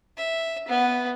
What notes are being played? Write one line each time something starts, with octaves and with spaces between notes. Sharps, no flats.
E5
B3